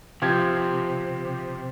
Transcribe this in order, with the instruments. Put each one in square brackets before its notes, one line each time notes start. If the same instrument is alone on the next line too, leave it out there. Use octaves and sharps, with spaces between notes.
[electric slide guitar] C3 [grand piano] F3 G4 G#6